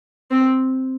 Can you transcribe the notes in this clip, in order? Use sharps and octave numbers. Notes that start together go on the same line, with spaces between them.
C4